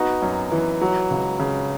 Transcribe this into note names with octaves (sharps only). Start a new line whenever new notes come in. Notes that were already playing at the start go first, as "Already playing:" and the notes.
Already playing: B3 D#4 F#4
F#2
E3
F#3
C#2
C#3